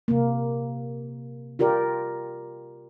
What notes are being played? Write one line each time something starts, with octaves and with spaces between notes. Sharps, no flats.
C3 A#3
F4 G4 A#4 D5